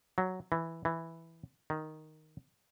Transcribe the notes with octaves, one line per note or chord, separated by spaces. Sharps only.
F#3
E3
E3
D#3